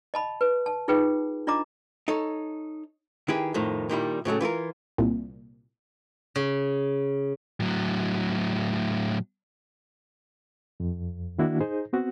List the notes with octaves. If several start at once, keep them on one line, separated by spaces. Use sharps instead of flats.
D#5 A5 B5
B4
A5
D#4 F4 G#4 B4 G5
D4 F4 D#5 A#5 D6
D#4 A4 C#5
D#3 E4 G4 G#4 B4
F2 A2 D#3
A#2 D#3 G3 E4
A2 C#3 F#3 A3
E3 F4 A4 A#4
C2 A#2
C#3
A2 F#3
F2
D#3 A#3 D4 E4 F#4
D#4 G#4 C5
B3 C4 F#4